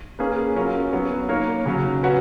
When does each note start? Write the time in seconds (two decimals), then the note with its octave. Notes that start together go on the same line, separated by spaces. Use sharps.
0.19 A#3 C#4 G#4 B4
0.56 F#3 C#4 F4 A#4
0.93 F#3 B3 F#4 C#5
1.29 A#3 D#4 A#4 C#5
1.66 C#3 F#3 C#4
2.03 F#3 C#4 F#4 B4